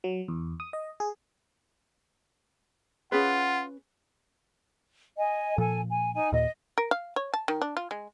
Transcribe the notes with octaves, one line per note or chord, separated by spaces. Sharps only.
F#3
E2
D#6
D#5
G#4
C#4 F4 G#4 B4 F#5
D#5 G#5
A#2 F3 A4 G#5
G#5
D#4 G#5
D#2 A#2 D#5
A#4
F5
C#5
A5
D#3
D4
F4
G#3